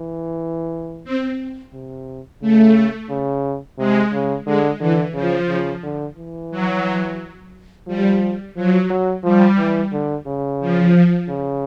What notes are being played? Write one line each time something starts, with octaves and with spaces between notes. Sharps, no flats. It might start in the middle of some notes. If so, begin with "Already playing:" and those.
Already playing: E3
C4
C3
C#3 A3
C#3
C3 G#3
C#3
D3 G#3
D3 E3
C#3 F3
C#3
D3
E3
F#3
F3 G3
F3 F#3
F#3
F3 G3
E3
D3
C#3
F3
C#3